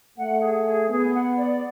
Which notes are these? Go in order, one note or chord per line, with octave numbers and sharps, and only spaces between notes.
A3 F#5
G#4
G#4
B3 G#4
F#5
D5